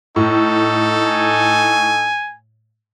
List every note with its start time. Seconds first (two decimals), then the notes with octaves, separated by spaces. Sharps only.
0.16 A2 D#4 A4
1.06 G#5